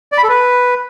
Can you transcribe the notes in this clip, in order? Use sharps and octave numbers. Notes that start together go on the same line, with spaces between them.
D5
B5
A4
B4